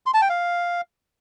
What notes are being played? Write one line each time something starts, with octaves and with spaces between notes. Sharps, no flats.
C6
A5
G5
F5